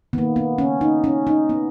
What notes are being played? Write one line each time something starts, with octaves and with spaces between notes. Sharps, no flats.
D#3 A#3 B3
B3
C#4
D#4
C#4
D#4
B3